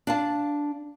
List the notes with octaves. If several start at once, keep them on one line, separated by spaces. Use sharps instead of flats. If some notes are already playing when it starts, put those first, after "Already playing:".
D4 F5 A5